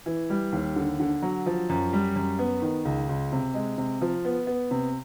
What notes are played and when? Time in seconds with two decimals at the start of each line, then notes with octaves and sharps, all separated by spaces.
0.06 E3
0.30 G3
0.52 D#2
0.76 D3
1.00 D3
1.22 F#3
1.46 F3
1.69 F#2
1.93 G3
2.16 F#2
2.39 B3
2.62 D#3
2.85 C#2
3.09 C#2
3.32 C3
3.54 G#3
3.78 C3
4.01 F3
4.25 B3
4.47 B3
4.71 C3